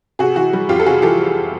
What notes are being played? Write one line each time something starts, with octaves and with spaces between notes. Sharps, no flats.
C3 F#4 G#4
E3 F#4
G3
F2 F4 G4
A4
C3 F#4 G#4
E3 G4 A4